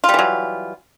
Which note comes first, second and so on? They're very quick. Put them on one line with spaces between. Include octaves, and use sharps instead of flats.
F4 G3 E3 F#3